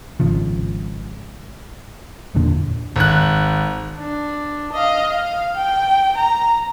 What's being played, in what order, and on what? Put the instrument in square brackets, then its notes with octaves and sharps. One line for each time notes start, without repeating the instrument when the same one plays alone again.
[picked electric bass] G#1 C#3 F3
F#1 E2 A#2 D3
[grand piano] G#1 F#6
[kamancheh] D4
D#5 F5
F5
G5
A#5